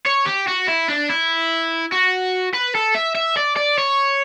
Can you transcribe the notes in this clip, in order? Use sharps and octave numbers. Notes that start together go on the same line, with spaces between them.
C#5
G4
F#4
E4
D4
E4
F#4
B4
A4
E5
E5
D5
D5
C#5